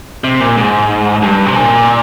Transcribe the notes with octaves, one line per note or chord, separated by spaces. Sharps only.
C3
A#2
G#2
G2
C3
A#2